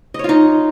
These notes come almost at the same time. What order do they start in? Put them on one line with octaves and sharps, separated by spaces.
D#5 C#5 F4 D#4